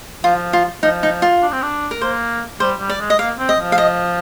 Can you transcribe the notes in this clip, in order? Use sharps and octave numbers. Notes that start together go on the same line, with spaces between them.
F3 F4
F4
F3 D#4
D#4
F4
D4
C4
D4
A#4
A#3 C5
G3 C5
G3
D5
G#3
D#5
A#3 F5
C4
D#5
F3
F5
D#5